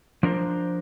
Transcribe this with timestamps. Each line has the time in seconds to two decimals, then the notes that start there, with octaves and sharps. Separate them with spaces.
0.23 F3 D4 A#4 C5